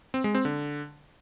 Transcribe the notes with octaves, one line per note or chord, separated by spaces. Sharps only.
C4
G#3
C4
D3